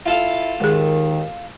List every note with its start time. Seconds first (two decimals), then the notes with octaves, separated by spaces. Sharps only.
0.06 E4 F4 A4 F5
0.60 D#2 D#3 G#3 G#4